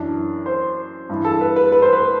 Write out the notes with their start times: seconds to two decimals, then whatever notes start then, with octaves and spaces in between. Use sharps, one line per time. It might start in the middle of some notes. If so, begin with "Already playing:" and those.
Already playing: F#2 E3 D4
0.46 C5
1.09 G2 E3
1.24 A4
1.41 B4
1.56 B4
1.72 B4
1.82 C5
1.93 B4